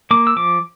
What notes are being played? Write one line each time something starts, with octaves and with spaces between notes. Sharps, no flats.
A#3 D6
E6
F3 D6